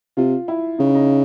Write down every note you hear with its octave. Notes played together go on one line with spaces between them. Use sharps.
C3 F4
E4
C#3 D#4
D#4